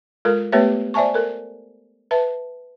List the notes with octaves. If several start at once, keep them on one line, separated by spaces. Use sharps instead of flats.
G#3 F4 A4 A#4
A3 B3 G4 B4 C#5 E5
C5 D5 E5 G#5 A5 C#6
A4 A#4
B4 E5 A5